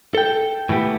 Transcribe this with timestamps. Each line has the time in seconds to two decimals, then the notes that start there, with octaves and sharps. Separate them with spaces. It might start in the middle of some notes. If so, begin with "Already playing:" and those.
0.15 A4 G5
0.69 A2 E3 B3 G4